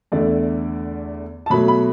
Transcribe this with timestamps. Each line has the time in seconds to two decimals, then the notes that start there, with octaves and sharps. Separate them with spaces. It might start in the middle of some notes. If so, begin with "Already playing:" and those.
0.12 E2 D3 A3 D5
1.46 A5
1.50 B2 F#3 A3 B5
1.68 B5